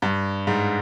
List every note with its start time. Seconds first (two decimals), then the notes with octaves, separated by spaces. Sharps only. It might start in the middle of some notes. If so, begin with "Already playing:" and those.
0.02 G2
0.47 G#2